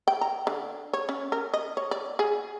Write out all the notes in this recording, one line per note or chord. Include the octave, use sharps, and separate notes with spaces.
G5
A#5
D3
C#5
C#4
A#4
D#5
C#5
D5
G#4